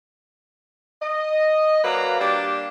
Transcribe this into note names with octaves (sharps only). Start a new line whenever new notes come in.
D#5
F#3 A#3 B4 D5 F5 A#5
G3 A#3 D4 G4